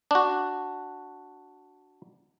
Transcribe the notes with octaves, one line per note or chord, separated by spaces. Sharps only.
D4 F#4